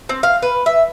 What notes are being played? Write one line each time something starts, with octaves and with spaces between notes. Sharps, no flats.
C4
F5
B4
E5